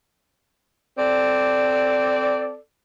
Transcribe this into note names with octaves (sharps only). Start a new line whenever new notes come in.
C4 A4 D5